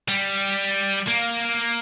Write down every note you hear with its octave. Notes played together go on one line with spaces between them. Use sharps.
G3
A#3